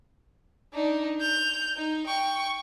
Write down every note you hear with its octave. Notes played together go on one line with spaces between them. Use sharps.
D4 D#4
G6 F7
D#4
G5 C#6